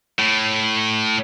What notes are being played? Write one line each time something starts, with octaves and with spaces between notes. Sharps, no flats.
A2